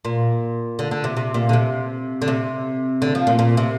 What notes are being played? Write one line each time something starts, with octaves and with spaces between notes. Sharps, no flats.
A#2
D3
D3
C3
C3
A#2
D3
C3
D3
C3
D3
F3
A#2
A#2
C3